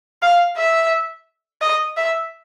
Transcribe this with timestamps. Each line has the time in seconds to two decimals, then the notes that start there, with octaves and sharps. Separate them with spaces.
0.22 F5
0.57 E5
1.62 D#5
1.97 E5